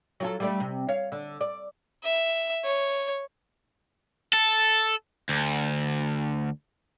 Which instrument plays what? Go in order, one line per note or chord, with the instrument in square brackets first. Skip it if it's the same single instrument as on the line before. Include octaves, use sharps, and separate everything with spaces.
[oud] F#3 F4 A4
G3 A3 D4
C3
C#5 F5
D3
D5
[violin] E5
C#5
[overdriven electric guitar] A4
D2